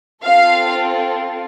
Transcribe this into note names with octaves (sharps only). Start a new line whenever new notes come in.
C4 F4 A4 F5